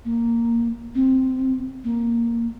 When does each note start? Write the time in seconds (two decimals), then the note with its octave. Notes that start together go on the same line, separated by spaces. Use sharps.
0.05 A#3
0.95 C4
1.84 A#3